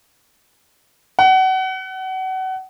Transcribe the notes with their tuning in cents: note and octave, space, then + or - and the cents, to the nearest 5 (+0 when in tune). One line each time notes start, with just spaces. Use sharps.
F#5 +30